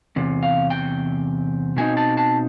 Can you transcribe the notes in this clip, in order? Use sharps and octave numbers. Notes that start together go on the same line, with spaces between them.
E2 C3
F5
G5
B2 G#3 C4 D#4 G#5
A5
A5